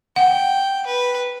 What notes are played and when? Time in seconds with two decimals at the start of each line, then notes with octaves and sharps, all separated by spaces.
0.16 F#5 G5
0.86 B4